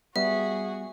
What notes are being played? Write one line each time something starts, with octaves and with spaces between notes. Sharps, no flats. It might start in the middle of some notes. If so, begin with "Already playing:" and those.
G3 B3 F#4 G#4 E5